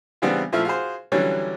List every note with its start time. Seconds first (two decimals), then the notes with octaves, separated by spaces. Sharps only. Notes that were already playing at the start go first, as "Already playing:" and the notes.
0.22 C#3 E3 G3 B3 C4 D4
0.52 A#2 F3 A3 E4 F4
0.65 F4 F#4 G#4 C5
1.12 D3 E3 F#3 G3 C#4